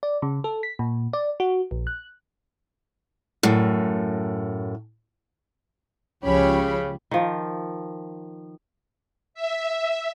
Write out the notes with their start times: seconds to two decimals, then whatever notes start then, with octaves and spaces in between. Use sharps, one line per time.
0.03 D5
0.22 C#3
0.44 A4
0.63 B6
0.79 A#2
1.13 D5
1.40 F#4
1.71 A#1
1.87 F#6
3.43 F#2 A2
6.23 C#2 C#3 F3 C#4 G4 C#5 B5
7.11 D#3 F3
9.34 E5